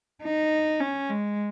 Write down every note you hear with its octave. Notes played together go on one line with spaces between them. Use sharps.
D#4
C#4
G#3